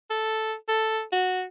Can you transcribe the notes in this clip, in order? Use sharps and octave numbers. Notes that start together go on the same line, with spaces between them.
A4
A4
F#4